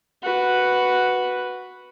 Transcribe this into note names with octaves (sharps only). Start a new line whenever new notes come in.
F#4 B4